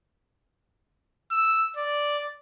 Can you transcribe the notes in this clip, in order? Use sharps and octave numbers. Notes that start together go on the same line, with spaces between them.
E6
D5